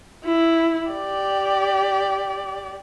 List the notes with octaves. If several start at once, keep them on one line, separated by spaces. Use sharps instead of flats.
E4
G4 D5